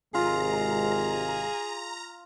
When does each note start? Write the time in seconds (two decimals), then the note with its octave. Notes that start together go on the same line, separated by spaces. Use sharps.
0.14 G#1 C3 G#3 F4 G#4 A#5